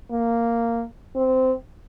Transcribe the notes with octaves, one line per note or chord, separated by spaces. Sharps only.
A#3
C4